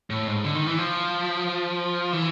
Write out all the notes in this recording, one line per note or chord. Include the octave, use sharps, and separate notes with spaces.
A2
G#2
D3
D#3
E3
F3
E3